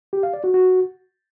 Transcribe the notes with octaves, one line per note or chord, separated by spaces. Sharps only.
G4
F5
D5
F#4
F#4